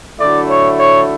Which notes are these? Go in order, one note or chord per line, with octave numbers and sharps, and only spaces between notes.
D3 F#3 A3 E4 D5
C#5
C#5